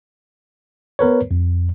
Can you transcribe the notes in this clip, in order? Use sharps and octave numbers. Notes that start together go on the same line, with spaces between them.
B3 A#4 B4 C#5
F2